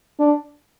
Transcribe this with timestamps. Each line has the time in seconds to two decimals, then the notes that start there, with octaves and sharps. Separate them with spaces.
0.19 D4